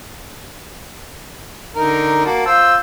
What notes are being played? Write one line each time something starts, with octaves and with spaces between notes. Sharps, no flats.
D3 D#4 A#4
A#3 F#4 A5
F4 C5 E6